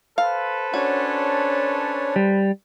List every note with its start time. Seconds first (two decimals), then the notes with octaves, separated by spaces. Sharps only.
0.18 A4 B4 C5 F5
0.74 C#4 D4 F#4 C#5
2.16 G3